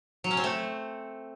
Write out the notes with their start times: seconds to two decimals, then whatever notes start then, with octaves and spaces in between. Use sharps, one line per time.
0.24 F#3
0.31 C#4
0.37 C4
0.44 A3